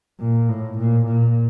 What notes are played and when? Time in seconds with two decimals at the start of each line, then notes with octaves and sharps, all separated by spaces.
0.20 A#2
0.49 A2
0.78 A#2
1.07 A#2